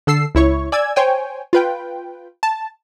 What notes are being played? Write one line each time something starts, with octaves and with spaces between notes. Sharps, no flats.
D3 A4 E6 C7
C#2 E4 C#5 C#6
D5 G#5 E6 G#6
C5 C#5 G5 G#5
F4 B4 G5
A5